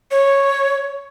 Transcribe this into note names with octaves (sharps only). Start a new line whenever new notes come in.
C#5